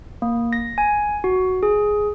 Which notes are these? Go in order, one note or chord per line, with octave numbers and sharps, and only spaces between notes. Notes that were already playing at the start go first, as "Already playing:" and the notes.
A#3
A#6
G#5
F#4
G#4